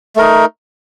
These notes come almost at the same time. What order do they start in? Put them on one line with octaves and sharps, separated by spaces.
A3 A#4 D#4